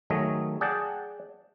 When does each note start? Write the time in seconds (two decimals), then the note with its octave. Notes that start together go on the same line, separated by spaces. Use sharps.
0.10 D#3 F#3 A3 G#4 D#5
0.61 G#4 D5 F#5 G5 A5